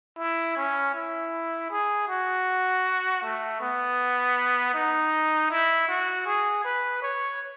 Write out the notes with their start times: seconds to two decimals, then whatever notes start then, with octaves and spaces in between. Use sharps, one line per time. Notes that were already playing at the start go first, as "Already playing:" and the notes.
0.18 E4
0.57 C#4
0.95 E4
1.71 G#4
2.08 F#4
3.22 A3
3.61 B3
4.75 D#4
5.50 E4
5.88 F#4
6.27 G#4
6.64 B4
7.02 C#5